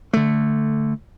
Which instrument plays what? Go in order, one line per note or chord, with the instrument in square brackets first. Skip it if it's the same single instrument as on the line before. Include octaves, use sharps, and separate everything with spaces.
[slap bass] D3 A3